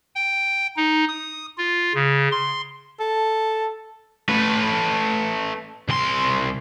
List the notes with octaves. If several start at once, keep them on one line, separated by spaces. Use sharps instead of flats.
G5
D#4
D#6
F4
C#3
C6
A4
A3 B4
C2 C6